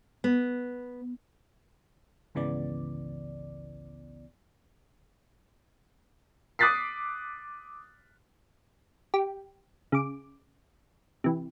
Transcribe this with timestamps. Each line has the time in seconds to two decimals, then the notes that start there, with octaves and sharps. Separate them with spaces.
0.24 B3
2.35 G#1 C#2 C#3 E3 B3 D5
6.59 D6 D#6 F#6 A6 B6 C7
9.14 G4
9.92 C#3 D6
11.24 C3 E3